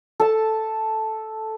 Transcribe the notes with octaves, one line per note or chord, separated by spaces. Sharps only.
A4 A5